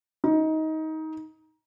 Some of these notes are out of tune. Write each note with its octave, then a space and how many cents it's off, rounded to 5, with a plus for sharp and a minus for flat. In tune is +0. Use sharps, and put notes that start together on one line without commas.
D#4 +20